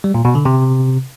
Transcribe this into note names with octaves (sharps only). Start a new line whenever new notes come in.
G3
A#2
B2
D3
C3